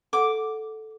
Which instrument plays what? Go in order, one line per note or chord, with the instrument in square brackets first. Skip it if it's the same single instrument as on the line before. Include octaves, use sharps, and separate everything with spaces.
[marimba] A4 F#5 [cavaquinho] D6